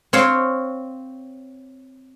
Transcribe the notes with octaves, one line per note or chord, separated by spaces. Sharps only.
C4 C#5 F5